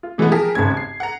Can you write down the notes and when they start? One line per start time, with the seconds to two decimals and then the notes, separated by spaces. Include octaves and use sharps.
0.03 F4
0.18 B2 E3 G#3 A3 B3
0.32 F3 G4 G#4 A#4 A5 B6
0.55 G#1 D#2 C#3 G#6
0.77 C7
1.00 F#5 A#5